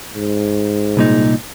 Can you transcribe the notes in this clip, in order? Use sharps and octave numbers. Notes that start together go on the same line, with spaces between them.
G#2
C2 A#2 D#4